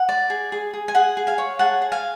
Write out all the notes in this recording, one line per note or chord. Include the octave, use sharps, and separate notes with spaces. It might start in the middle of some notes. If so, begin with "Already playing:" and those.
Already playing: F#5
D5
G#4
G#4
G#4
G#5
G#4 F#5
G#4
F5 G#5
C#5
G#4 F#5 A5
G#4
F5 G#5